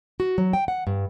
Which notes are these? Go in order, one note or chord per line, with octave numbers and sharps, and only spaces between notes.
F#4
F#3
G5
F#5
G2